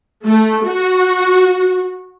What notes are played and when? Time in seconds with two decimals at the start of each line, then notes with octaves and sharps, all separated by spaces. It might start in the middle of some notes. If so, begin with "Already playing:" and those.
0.23 A3
0.64 F#4